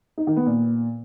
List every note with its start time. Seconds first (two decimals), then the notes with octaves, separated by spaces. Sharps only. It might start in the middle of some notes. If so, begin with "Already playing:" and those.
0.18 D#4
0.27 D#3
0.37 B3
0.46 A#2